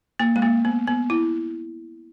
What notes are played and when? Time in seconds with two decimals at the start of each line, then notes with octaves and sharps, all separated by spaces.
0.20 A#3
0.36 G#3
0.42 A#3
0.65 B3
0.87 B3
1.10 E4